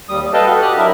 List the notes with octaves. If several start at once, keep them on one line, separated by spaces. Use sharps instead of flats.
D#2 G3 D#6
G3
A4 B4 D#5 F5 G5 A5
F#4 A4
G4 D#6 F6 F#6
F#3 D4 E4 A#4 E5